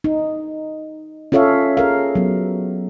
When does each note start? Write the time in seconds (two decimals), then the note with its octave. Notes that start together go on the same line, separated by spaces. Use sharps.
0.04 D#4
1.32 C#4 F4 A4 C#5 E5 F5
1.77 G#4 A#4 F5
2.15 F#3 B3